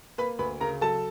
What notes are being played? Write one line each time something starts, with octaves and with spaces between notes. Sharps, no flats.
A#3 B4 B5
D2 B4 B5
C#3 A#4 A#5
F#3 A4 A5